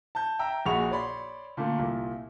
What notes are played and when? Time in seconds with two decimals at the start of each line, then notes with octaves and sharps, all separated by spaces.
0.15 A5 G6
0.39 E5 G5 A#5 E6
0.66 A#1 F#4 G#4 B5 C#6 F7
0.91 C#5 D5 B5 C6
1.57 A#2 D3 A3 A#3
1.79 C2 A#2